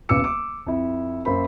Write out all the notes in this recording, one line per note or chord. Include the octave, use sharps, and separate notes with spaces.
D#1 C#3 B3 D6 E6 C#7
D6
F2 E4
F#2 A#3 C5 B5